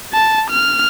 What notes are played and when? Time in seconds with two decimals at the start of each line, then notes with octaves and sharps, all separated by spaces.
0.13 A5
0.51 F6